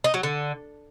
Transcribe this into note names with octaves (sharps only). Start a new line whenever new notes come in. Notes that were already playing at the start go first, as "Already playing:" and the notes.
D#4
F#3
D3